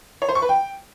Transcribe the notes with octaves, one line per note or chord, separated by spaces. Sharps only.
C#5
C5
C#6
B4
G5